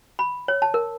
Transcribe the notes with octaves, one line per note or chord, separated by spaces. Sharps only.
B5
C#5
A5
A#4